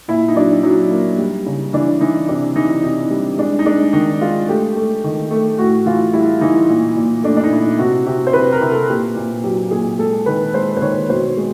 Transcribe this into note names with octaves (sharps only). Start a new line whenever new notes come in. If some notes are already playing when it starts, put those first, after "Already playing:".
A#2 E4
D#4
F#3 D4
F#3 D#4
A#3
G3
C#3
E3 D4
E3 D#4
C3 D4
E3 D#4
C3 D#4
G3
G#3 D4
D#4
G#3 D4
D#3 D#4
G#3 F4
A3 G4
A3
D#3
A3
A2 F#4
E3 F4
G3 E4
E3 D#4
A#2
A#2
A3 D4
D4
D#4
A#2 E4
C3 F#4
C3 G4
C5
C3 B4
A#4
C3
A4
A#2 G4
A#2
F#3 G4
A#2 G#4
G#3 A4
D#3 B4
G#3 C5
C5
D#3 C#5
B2 C5
G#3